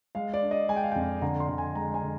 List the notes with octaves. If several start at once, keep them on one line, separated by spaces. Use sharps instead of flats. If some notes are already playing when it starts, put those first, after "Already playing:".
G#3 F5
D5
D4
D#5
G#3 G#5
G5
F5
F2 G5
D3 A#5
C6
D3
G#5
G#3 A#5
G#5
D3